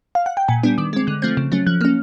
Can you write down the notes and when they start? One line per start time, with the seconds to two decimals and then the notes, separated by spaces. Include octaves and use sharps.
0.15 F5
0.26 F#5
0.37 G5
0.48 A#2 G#5
0.63 G3 B3 D4
0.78 D#3 D6
0.93 G#3 C4
1.07 D3 F#6
1.22 F3 A3 C4 G6
1.37 C#3
1.52 F#3 A3 C#4
1.67 F3 F#6
1.81 A#3 C#4 F6